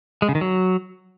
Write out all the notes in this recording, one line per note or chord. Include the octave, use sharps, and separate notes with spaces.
G#3
C#3
D#3
F#3